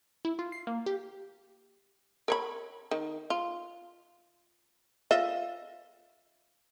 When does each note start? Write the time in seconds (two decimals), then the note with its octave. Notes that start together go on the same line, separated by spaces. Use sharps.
0.25 E4
0.39 F4
0.52 C7
0.67 A#3
0.86 G4
2.28 A#4 C#5 B5
2.91 D#3
3.30 F4
5.11 F4 D#5 E5